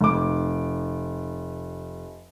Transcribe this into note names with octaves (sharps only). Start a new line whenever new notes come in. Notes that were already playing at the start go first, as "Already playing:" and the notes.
F1 D6